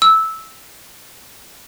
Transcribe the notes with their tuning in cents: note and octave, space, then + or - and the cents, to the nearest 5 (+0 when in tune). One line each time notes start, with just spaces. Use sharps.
E6 -10